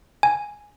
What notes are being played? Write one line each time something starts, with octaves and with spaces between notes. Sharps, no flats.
G#5